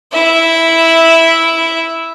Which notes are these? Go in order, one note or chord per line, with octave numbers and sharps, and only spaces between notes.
E4 E5